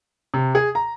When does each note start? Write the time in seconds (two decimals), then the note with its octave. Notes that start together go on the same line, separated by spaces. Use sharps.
0.34 C3
0.55 G#4
0.75 A#5